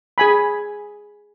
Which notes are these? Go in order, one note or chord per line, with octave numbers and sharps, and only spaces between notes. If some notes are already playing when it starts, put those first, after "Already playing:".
G#4 G#5 B5